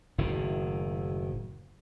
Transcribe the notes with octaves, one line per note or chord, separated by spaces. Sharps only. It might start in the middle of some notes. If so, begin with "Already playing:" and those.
F#1 A2 D#3